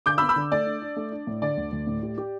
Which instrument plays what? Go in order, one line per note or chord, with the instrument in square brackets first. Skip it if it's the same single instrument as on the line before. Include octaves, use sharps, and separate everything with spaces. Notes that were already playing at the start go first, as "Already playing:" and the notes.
[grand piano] D3 [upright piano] D6 G6
[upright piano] B5 E6
[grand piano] B3
[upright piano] B5 E6
[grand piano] D3
[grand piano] A3 [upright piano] D5
[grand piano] D4
D4
A3
D4
A2
[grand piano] D3 [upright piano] D5
[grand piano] D2
D2
A2
G4
G4